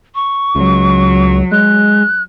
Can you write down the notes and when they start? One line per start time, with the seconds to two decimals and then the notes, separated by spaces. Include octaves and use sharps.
0.15 C#6
0.55 C#2 F#3
1.52 G#3 F#6